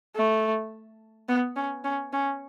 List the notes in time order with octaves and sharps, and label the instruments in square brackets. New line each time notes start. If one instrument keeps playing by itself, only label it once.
[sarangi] A3
B3
C#4
C#4
C#4